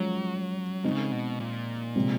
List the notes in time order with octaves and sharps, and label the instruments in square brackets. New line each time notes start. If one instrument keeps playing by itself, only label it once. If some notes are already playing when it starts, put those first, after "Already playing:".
Already playing: [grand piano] F3 G#3 C#4 [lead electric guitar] F#3
[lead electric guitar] C#3 [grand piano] G#3 C4 D#4
[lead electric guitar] B2
A#2
[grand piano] C3 F3 G#3 C4